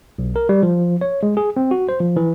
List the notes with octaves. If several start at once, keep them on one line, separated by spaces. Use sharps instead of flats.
B1
A#4
G3
F3
C#5
G#3
G#4
C4
F#4
C5
F3
E3